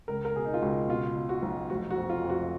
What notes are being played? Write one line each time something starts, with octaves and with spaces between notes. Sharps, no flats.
C#2 A#4
A#4
B2 G#4
D#4
F4
C#2 F#4
B2 F4
B2
F#4
B1
F1 F#4
F#4
F2
F4
F2
F#4